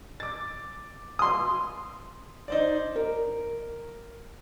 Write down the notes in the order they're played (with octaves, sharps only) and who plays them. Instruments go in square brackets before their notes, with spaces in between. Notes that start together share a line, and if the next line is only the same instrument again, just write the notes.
[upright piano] D6 A6
[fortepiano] C6 D#6
[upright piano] D#4 C5 D5
[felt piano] A#4